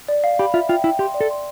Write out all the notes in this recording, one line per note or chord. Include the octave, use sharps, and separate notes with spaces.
D5
F5
G4 B5
F4 E5
F4 G5
E4 G5
G4 C6
D5
A4
C6